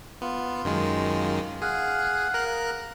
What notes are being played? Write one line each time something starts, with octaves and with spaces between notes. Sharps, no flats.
B3 F4
F#2 D#3 G#3
G#4 F5 F#5
A#4 F#6